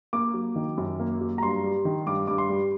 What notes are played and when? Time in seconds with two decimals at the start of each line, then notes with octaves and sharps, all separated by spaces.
0.13 A#3 D6
0.34 F#3
0.56 D#3
0.78 F#2
1.00 A#3
1.21 F#3
1.38 A#5
1.43 G2 C6
1.64 G3
1.85 D#3
2.06 G2 D6
2.27 G2 D6
2.38 C6
2.50 G3